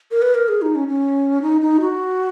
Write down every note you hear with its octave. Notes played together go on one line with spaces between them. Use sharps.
A#4
B4
A#4
G#4
D#4
C#4
C#4
D#4
D#4
F#4